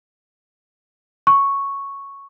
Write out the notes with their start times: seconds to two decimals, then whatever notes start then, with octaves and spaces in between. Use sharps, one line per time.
1.27 C#6